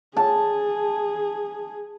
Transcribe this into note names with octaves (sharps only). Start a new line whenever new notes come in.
G#4 A5